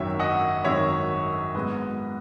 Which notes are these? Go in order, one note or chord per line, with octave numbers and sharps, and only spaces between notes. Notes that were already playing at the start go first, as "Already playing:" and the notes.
Already playing: G#1 F#2 D#3 F#3 C#5 E5
D#5 F#5
G#1 F#2 D#3 F#3 C#5 E5
G#2 F#3 B3 B4 D#5